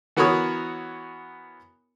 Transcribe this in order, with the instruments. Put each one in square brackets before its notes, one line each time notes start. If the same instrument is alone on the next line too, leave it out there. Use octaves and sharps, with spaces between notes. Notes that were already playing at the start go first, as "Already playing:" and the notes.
[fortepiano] E3 B3 F#4 A#4 C#5 D#6